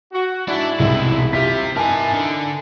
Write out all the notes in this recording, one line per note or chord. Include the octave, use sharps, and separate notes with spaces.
F#4
G#2 D4 E4
C2 B2 G#3 E5
C3 F4 G4 E5 B6
E3 D#4 E4 A#4 G#5 A5
D3